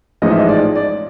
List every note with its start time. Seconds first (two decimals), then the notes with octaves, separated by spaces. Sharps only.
0.22 A1 G#2 F3 G#3 D#5
0.31 E5
0.39 D#5
0.49 D5
0.75 D5